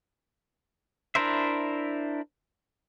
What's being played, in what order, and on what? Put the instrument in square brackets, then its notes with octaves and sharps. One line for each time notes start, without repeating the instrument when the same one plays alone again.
[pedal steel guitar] D4 E4 A#4 C5 E5